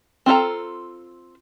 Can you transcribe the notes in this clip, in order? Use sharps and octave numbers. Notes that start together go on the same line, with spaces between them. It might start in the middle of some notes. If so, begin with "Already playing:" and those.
C4 F4 A4 A#5